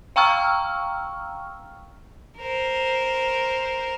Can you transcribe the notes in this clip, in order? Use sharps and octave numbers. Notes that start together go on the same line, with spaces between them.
F5 G5 A#5 C#6 E6 F6
A#4 C5